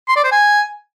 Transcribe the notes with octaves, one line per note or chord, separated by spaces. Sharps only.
C6
D5
C5
G#5